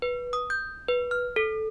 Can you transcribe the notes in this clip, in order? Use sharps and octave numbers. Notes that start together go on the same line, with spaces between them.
B4
D#6
G6
B4
F6
A4